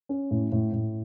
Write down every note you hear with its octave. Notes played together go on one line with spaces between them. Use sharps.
C#4
A2
A2
A2